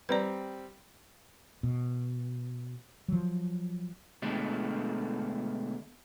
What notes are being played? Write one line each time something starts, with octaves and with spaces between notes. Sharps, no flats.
G3 C4 B4 D5 A#5
B2
F3 F#3
B2 D3 G#3 A3